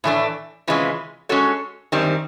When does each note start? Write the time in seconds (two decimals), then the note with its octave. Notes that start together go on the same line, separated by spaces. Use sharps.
0.04 A2 E3 A3 D4
0.68 C3 E3 G#3 C#4 F4
1.29 G#3 C#4 F#4 A4 C#5
1.92 F#2 D#3 G3 C4